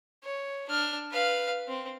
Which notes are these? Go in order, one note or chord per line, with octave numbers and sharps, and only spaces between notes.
C#5
D4 F6
B4 F5
C4